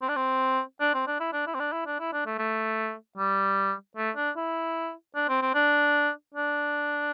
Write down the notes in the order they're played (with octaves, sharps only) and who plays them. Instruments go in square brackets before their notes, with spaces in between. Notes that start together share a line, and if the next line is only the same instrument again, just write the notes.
[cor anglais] C4
D4
C4
D4
C4
D4
E4
D4
E4
C4
D4
E4
D4
E4
D4
A3
A3
G3
A3
D4
E4
D4
C4
C4
D4
D4